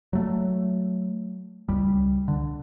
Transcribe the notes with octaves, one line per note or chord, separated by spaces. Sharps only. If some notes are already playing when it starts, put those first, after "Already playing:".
F#3 A3
C#2 G3
D3